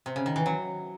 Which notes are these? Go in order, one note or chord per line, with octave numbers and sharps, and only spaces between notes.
C3
C#3
D#3
E3
F#3